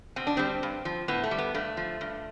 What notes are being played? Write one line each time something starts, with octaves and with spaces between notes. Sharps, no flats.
B2 C4
D4
G3 C4
G2
F3
A2 B3
A3
G3
B3
G2 A3
F3
G2